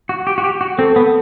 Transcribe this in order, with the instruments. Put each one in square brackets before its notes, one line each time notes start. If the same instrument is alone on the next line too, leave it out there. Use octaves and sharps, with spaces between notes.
[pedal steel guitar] F#4
G4
F#4
G4
F#4
[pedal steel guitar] C4 [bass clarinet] A4
[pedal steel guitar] B3